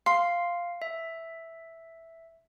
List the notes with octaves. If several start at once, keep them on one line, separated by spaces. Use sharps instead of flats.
F5 C6
E5